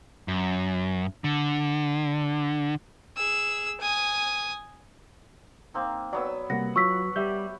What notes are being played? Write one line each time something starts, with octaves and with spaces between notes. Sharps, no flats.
F#2
D3
G#4 E6
G#5 D#6
A#3 C4 D#4
F#3 B3 D5 E6
C3 G3 A#3 F#5 A#6
F#3 F4 C#6 E6 B6
G3 G4 E5 G6